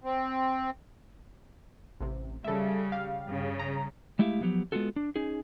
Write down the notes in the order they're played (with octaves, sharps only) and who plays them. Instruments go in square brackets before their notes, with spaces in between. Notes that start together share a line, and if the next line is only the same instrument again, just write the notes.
[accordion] C4
[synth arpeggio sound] A1 C3
[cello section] C#3 G3 [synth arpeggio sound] A4 E5
[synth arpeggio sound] G4 F5
[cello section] G2 C#3
[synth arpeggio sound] A#5
[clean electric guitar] G#3 A3 E4 G4 E5 F5
F3 F#3 B3 G4
G#3 B3 C4 F4 F#4 A4
D4
C#4 D#4 G#4